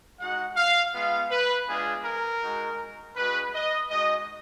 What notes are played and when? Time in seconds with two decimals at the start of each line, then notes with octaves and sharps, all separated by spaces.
0.19 G#3 D#4 F#4 F#5
0.56 F5
0.94 G#3 B3 F4 F5
1.30 B4
1.68 G#3 B3 D4 F4 G#4
2.05 A#4
2.42 G#3 D#4 F#4
3.16 G#3 D4 F#4 B4
3.54 D#5
3.90 G#3 D#4 F#4 D#5